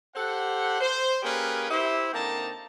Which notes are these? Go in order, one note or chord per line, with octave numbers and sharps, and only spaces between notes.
G4 A4 C5 F#5
C5
A#3 C#4 G4 G#4 A#4 B4
E4 G4 C5
D3 A#3 C4 D#4 A5 A#5